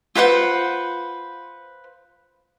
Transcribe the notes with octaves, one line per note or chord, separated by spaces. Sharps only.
F4 B4 C5 F#5